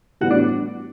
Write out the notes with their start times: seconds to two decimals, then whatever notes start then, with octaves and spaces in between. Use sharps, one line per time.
0.21 A2 E3 G3 B3 F#4
0.31 D4